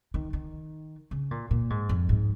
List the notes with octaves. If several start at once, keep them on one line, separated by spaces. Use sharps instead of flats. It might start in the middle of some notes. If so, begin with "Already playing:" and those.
D#3
D#3
C#3
A#2
A#2
G#2
F2
G#2